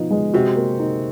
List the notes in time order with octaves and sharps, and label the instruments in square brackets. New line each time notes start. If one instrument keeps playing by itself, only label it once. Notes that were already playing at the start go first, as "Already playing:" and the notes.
Already playing: [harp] B2 [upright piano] F3 D#4
[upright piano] G#3
[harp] C3 [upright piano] F#4
[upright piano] A#3
D#4